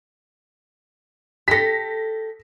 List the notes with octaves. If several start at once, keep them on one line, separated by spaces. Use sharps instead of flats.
G4 A4 A#6 B6